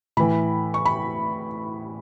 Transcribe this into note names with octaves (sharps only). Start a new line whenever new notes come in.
A2 E3 B5
C#6
B5